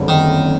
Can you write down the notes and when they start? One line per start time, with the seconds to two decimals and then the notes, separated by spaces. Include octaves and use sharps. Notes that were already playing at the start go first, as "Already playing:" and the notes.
Already playing: F#1 F2 D3 G3
0.08 D#3